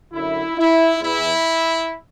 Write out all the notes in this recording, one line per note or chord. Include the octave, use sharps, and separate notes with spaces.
F#2 D3 E4
E4
E2 E3 E4